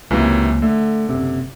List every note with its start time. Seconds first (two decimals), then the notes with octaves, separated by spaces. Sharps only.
0.11 C#2 F#2 C3 E3 A#3
0.62 D3 A3
1.09 F#1 C3